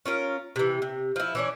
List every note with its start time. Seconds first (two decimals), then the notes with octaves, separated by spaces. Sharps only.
0.06 C#4 F4 A#4
0.56 C3 E3
0.82 C3
1.16 F3 E4
1.35 E3 C#4 D4